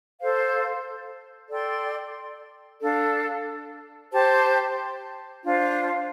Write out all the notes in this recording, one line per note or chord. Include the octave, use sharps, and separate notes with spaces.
A4 C5 F5
A4 D5 G5 C6
D4 A4 F5
G4 C5 A5
D4 F4 C5 F5